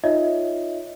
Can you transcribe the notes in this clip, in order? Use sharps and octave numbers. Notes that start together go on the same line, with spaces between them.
D#4 F4 C#5 D#5 E5